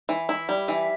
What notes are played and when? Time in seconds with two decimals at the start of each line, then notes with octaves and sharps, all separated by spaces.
0.09 E3
0.29 E4
0.49 G3
0.68 E3 E5